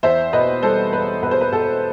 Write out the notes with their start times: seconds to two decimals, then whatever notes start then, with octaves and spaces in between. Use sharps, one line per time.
0.03 E2 C5 E5
0.33 B2 B4 D#5
0.62 G3 A4 C5
0.92 E1 B4
1.22 B2 B4
1.31 C5
1.41 B4
1.52 B2 A4